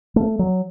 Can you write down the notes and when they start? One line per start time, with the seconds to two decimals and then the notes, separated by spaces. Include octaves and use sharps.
0.16 A3
0.39 F#3